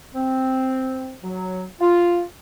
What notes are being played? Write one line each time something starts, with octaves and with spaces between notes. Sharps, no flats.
C4
F#3
F4